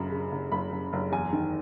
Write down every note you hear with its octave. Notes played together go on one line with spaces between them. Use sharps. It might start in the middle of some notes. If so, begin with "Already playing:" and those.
Already playing: F#1 F#2 C#3 B5
C#3
F#1
F#1 B5
F#1
F#1
E2 G#5
D#3